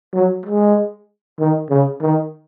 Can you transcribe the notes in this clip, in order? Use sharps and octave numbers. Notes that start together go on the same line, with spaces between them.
F#3
G#3
D#3
C#3
D#3